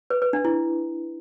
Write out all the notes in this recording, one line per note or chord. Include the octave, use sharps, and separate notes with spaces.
B4
B4
D4
E4